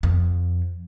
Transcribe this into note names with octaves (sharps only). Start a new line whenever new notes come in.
F2